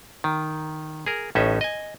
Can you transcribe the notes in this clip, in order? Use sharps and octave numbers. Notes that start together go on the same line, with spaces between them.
D#3
G#4 A#4
A1 A2 C#4 D#4 E5
D#5 G#5